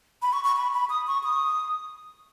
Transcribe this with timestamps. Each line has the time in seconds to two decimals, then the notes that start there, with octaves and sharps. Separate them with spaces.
0.22 B5
0.33 C#6
0.44 C#6
0.56 B5
0.73 B5
0.90 D#6
1.07 C#6
1.23 D#6